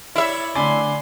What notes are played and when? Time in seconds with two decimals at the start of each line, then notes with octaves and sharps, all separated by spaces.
0.16 E4 C#5 D5 E5
0.55 D3 A3 D5 G#5 B5 C6